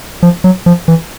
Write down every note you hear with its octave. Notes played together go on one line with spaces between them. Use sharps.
F3
F#3
F3
E3